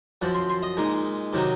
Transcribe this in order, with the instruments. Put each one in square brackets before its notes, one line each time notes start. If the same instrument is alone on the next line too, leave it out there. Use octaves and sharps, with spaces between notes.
[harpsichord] F#2 F3 C4 F#5
C6
C6
D#5
A#2 G#3 D#4
C3 D#3 F#3 C4 D#4